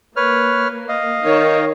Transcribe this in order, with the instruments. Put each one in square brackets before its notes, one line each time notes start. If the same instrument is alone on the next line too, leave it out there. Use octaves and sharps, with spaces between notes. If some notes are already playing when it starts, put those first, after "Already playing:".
[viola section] A#3 [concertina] B4 C#5 F6
[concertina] D#5 F5
[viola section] D#3 C#5